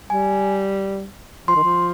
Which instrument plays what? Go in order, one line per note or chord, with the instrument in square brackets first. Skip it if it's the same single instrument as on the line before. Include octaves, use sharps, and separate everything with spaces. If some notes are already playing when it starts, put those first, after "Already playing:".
[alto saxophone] G3 [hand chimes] G#5
[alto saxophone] F3 [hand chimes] C6
[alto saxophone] D#3
F3